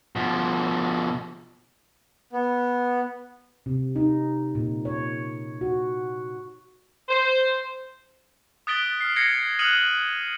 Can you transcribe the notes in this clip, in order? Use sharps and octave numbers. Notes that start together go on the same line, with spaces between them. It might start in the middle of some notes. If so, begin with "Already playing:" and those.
B2 F3
B3
C3
D#4
A#2
C#5
F#4
C5
D#6 F#6 A6 B6 D7 G7
F6 C7
G#6 A#6 C7 C#7
D#6 F6 F#6 C#7 D#7 F#7